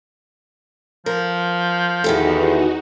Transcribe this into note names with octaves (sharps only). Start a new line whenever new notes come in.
F3 A#4
E2 D#3 D#4 F#4 G4 A4